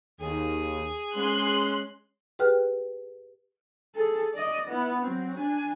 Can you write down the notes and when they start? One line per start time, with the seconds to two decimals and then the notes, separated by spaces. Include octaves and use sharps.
0.21 D#2 G#4
1.15 G#3 C#4 C6 F#6
2.39 G4 G#4 B4 G5 F6 F#6
3.95 G#4 A4
4.33 D5 D#5
4.68 B3 E4
5.01 F#3 C4
5.37 D4 G#5